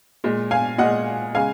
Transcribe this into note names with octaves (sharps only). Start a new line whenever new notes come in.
A#2 G#3
F5 G#5
A#2 G#3 D#5 F#5
C#3 G#3 F5 G#5